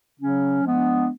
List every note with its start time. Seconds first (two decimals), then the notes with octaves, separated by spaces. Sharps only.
0.20 C#3 F#3 C#4
0.63 F3 G#3 B3 D4